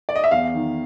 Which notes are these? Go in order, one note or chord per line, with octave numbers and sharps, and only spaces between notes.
D5
D#5
E5
E2 F5
D#3